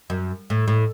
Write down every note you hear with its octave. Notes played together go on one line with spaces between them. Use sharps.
F#2
A2
A2